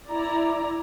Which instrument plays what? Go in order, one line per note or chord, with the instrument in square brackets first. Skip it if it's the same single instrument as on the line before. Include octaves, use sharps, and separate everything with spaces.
[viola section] E4 D5 A#5